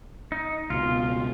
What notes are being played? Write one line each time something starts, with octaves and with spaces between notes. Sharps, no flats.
D#4
C#2 B2 F4